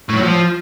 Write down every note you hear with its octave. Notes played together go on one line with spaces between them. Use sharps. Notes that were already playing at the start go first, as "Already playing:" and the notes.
A2
F#3
F3